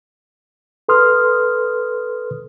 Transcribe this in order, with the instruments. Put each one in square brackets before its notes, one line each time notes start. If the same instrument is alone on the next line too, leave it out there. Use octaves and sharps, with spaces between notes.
[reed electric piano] A4 B4 C6 D#6 F6